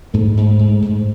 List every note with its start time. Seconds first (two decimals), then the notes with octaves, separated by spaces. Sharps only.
0.14 G#2 A3
0.37 G#2
0.59 G#2
0.82 G#2